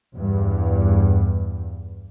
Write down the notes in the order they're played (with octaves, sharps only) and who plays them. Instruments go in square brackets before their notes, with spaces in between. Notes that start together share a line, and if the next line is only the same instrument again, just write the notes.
[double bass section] E2 G2